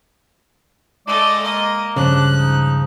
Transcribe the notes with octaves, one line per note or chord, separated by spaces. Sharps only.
G#3 A3 D5 D#5
A#3 D#5
C#2 G2 C#3 F3 D4 F#6
D#4